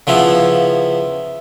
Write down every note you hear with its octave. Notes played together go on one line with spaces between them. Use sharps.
C#3 F3 B3 E4